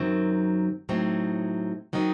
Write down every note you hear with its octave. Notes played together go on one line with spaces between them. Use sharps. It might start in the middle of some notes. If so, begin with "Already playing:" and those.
Already playing: F#2 D#3 F#3 C4
A2 F#3 C4 D#4
D#3 F#3 C4 D#4